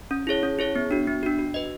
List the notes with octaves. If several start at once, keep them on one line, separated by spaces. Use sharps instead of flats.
C#4
E4 G#4 C#5
C#4
E4 G#4 C#5
B3
D4 F#4
B3
D4 F#4
F#4
B4 D#5